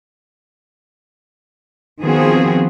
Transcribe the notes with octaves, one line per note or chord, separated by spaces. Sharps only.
D#3 F3 B3 C4 F#4 G#4